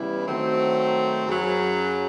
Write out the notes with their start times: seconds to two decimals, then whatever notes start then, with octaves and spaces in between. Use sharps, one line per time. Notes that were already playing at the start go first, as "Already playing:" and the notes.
Already playing: C#3 E3 G3 B3 E4
0.28 D#3 F#3 A3 C4
1.26 F#2 C#3 F#3